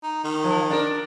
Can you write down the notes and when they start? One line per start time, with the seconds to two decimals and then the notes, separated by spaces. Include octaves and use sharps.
0.03 D#4
0.24 D#3
0.44 F3
0.70 D4 A#4